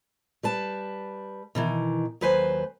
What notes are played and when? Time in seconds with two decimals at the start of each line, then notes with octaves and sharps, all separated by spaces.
0.43 G3 B4 A5
1.55 B2 D#3 E3
2.21 D#2 F#3 B4 C5 G#5